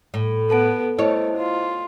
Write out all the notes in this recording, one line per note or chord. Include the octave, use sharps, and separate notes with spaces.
A2
B3 A4 A5 D7
A3 E4 C5 C#5 D#5
F4